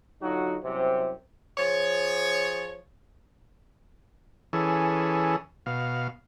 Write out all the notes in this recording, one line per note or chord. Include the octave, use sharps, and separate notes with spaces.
D3 F#3 D#4 F4 F#4
C2 F#2 C3
F3 G#4 C#5
E3 C#4 G#4 A4
B2 F5